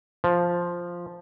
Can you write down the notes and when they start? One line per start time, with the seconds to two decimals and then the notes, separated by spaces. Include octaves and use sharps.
0.24 F3